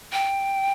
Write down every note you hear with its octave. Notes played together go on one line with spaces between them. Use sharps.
G5